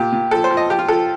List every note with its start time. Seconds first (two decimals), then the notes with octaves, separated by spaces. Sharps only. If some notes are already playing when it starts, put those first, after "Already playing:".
Already playing: A#2 G4
0.12 A#2
0.31 F3 A4
0.44 C5
0.50 F3
0.57 D#5
0.70 F3 G4
0.79 F4
0.88 F3 A4